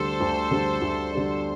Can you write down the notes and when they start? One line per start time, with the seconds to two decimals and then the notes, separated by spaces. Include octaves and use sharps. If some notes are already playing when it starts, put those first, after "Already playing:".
Already playing: D2 D3 G3 D4 A4 C5
0.20 D2
0.51 D3 G3 D4
0.82 D2
1.12 D3 G3 D4